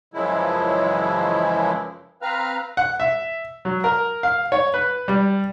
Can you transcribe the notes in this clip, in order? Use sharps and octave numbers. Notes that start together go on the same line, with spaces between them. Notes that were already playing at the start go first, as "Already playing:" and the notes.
F#2 C#3 E3 F3 G#3 E4
C4 B4 F5 A#5 F6
F#5
E5
F#3
A#4
F5
C#5
B4
G3